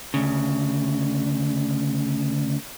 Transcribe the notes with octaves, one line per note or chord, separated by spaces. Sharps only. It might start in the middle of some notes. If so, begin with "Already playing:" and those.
D2 C#3